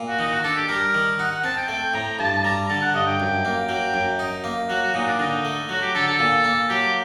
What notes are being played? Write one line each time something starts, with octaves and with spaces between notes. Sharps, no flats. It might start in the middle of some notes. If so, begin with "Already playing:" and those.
Already playing: A#2
F#4
D#3 D#4
F#4
D4 A4
G4
G3 A#4
D#3
D#4 F#5
F#5
C4 A5
G5
A3 G5
A2 A#5
G2 A5
G3 A#5
D3 A5
F#5
G2 D#5
G5
F#2
A#3
F#3 G5
F#2
D#4
A#3
F#3 F#4
F#4
A#2 D#4
D4
D3 D#4
A3
F#3 F#4
G4
D3 A4
A4
A#2
A#3
F#3 G4